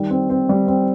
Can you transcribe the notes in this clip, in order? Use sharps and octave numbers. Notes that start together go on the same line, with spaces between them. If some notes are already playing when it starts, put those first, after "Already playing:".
Already playing: D#3 G3
C4
C4
G3
C4